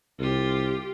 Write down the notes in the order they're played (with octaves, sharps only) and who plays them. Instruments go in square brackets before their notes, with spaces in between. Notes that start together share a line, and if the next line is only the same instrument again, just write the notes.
[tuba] C2 [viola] F4 G4